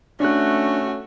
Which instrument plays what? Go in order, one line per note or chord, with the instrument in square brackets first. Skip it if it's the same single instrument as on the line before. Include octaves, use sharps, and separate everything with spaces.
[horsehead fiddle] A3 F#4 [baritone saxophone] C#4 [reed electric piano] D4 F#6